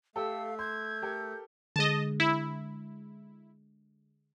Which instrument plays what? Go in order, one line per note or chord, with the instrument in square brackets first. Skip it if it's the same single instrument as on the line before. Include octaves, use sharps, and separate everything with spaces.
[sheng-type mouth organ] A3 [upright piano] G4 A4 [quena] F5 [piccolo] E6
[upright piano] C6 [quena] G6 [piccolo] G#6
[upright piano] G4 A4 A#4
[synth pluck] D3 G#3 [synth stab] D#5 A5
[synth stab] E4